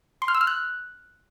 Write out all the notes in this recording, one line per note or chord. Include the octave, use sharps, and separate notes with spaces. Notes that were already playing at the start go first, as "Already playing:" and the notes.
C6
F6
E6
F6
F#6